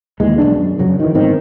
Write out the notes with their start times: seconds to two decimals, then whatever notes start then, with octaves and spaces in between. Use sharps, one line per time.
0.20 D#2 E3 G#3
0.38 B1 G2 G#3 D4
0.53 F#2
0.79 F#2 C#3 F#3
1.00 D#3 E3
1.15 G1 G#2 D#3 C4